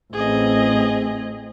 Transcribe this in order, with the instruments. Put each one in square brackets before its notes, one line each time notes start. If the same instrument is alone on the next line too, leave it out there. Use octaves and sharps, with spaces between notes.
[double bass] A1 C4 [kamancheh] G#4 D#5